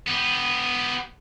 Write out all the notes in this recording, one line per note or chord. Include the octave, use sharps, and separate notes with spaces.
B3 G4